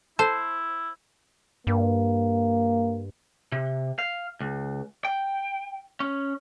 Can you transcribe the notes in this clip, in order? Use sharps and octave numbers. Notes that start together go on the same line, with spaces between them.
E4 A4 C5
G2 A#3
C3
F5
C#2
G5
C#4